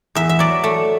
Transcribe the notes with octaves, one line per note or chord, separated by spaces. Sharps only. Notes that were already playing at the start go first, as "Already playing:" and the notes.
E2 E5
E5
F#3 D5
A3